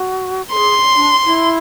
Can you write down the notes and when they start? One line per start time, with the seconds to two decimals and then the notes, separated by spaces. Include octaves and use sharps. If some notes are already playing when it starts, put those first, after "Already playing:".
Already playing: F#4
0.52 G#4 A4 C6
0.96 D4
1.26 E4